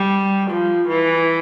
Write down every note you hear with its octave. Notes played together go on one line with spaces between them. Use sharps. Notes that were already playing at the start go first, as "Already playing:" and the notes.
Already playing: G3
F3
E3